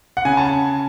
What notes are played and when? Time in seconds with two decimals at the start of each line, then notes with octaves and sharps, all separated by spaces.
0.17 F#5
0.25 C#3 G#5
0.37 A5